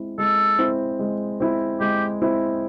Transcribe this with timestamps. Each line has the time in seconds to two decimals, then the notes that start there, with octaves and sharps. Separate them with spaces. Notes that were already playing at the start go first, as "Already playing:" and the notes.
Already playing: G#3 C4 E4
0.18 G#3 A4
0.59 C4 E4
0.99 G#3
1.40 C4 E4
1.80 G#3 G4
2.22 C4 E4